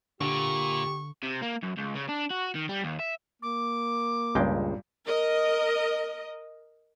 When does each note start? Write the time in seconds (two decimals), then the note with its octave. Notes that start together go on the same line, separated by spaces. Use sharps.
0.21 A#2 D3 G4 C#6
1.23 C3
1.42 A#3
1.63 F#2
1.78 C#2
1.95 C#3
2.09 D4
2.30 F#4
2.55 D#3
2.69 G3
2.84 D#2
2.99 E5
3.42 A#3 D6
4.35 C#2 G2 A#2 G#3 G5
5.05 A#4 D#5